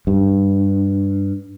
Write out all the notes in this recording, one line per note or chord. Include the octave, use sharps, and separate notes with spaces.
G2